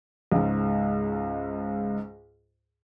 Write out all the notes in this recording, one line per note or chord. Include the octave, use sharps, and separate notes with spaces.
C#2 G#2